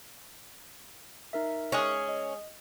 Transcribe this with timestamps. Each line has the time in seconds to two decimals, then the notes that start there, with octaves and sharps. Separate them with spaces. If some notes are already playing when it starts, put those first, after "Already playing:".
1.33 D#4 A#4 E5
1.72 G#3 C#4 G#4
2.09 D#5